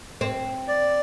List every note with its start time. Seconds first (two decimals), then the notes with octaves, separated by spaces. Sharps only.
0.21 C4
0.68 D5